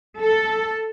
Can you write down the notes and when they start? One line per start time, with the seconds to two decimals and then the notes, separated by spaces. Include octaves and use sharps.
0.20 A4